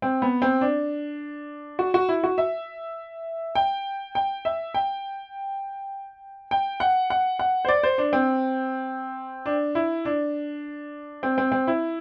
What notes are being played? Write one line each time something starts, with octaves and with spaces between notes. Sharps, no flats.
C4
B3
C4
D4
F#4
F#4
E4
F#4
E5
G5
G5
E5
G5
G5
F#5
F#5
F#5
C5
D5
C5
D4
C4
D4
E4
D4
C4
C4
C4
E4